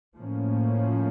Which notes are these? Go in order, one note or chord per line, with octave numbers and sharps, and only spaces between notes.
A2 F3 A#3 C#4